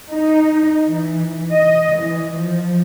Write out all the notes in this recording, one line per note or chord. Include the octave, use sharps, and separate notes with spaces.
D#4
E3
D#5
E3
F3